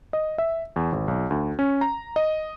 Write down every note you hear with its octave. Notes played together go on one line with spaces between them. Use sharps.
D#5
E5
E2
G#1
B1
D2
C#4
A#5
D#5